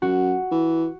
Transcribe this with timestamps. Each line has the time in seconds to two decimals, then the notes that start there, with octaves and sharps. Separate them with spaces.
0.02 F#2 F#4
0.51 E3